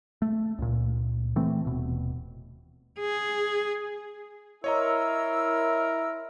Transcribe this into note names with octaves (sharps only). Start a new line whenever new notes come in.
A3
C#2 A#2
E3 A3 C4
D#1 B2
G#4
E4 A#4 C#5 D#5 A#5 C6 E6